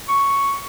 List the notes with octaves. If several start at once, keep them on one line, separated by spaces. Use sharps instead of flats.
C#6